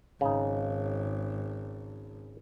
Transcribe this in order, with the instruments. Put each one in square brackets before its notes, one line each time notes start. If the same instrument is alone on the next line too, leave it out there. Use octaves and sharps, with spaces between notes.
[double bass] G#1 [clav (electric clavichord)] C#3 D#4